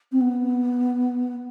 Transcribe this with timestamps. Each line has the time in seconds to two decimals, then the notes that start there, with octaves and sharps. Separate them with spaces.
0.12 C4
0.21 B3